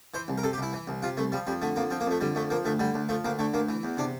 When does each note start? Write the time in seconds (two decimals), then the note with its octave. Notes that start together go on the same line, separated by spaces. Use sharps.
0.14 E3 C5
0.28 C2
0.38 A#4
0.43 C3 A4
0.53 G4
0.58 C2 E4
0.73 E3
0.87 C2
1.02 C3 F4
1.17 C2 A3
1.32 F3 G3
1.47 F2 G3
1.62 D3 A3
1.76 F2 A#3
1.91 F3 C4
2.00 A#3
2.06 F2 A3
2.21 D3 G3
2.35 F2 A3
2.50 F3 A#3
2.65 D2 A3
2.80 D3 G3
2.94 D2
3.09 F3 A3
3.25 D2 A#3
3.39 D3 A3
3.54 D2 A#3
3.69 E3
3.83 E2
3.97 C3 D4